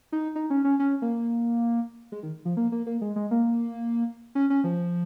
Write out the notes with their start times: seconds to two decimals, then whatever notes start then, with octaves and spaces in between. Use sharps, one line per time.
0.12 D#4
0.35 D#4
0.50 C#4
0.64 C#4
0.79 C#4
1.02 A#3
2.12 G#3
2.23 D#3
2.45 F3
2.57 A#3
2.72 A#3
2.87 A#3
3.02 G#3
3.16 G#3
3.31 A#3
4.35 C#4
4.50 C#4
4.64 F3